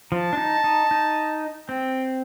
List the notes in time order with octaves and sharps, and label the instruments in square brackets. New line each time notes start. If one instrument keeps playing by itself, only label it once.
[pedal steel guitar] F3 [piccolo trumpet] A5
[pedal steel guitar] D4
D#4
D#4
D#4
[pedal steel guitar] C4 [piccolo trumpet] G5